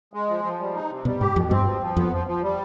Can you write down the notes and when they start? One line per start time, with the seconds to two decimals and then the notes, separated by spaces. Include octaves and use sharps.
0.13 G#3
0.29 F3
0.44 F3
0.60 G3
0.74 D#4
0.90 C3
1.05 B2 G3
1.20 G#2 G4
1.35 F2 B2
1.51 G2 C4
1.66 F3
1.81 F3
1.97 F2 B3
2.12 F3
2.27 F3
2.42 G3